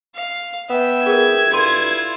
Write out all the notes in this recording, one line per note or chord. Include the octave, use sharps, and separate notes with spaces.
F5
B3 E5 G5
G#4 A#4 G#6
G2 E4 F4 A4 C6 D#7